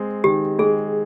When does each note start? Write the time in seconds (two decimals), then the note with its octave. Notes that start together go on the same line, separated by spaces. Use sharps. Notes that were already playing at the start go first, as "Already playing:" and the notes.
Already playing: G#3 C4
0.24 D#3 G4
0.59 G#3 G#4